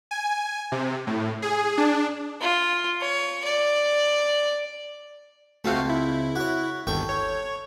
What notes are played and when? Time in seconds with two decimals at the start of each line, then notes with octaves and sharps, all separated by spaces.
0.11 G#5
0.72 C3
1.07 A2
1.42 G#4
1.78 D4
2.41 F4
3.01 C#5
3.45 D5
5.64 C#2 A3 C4 F#4 F5 A5
5.90 E4
6.36 F#4 C#5
6.87 G1 D#2 A4 G5 C#6
7.09 C#5